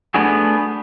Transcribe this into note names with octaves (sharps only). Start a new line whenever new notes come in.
A3 B3 D4 F#4 G#4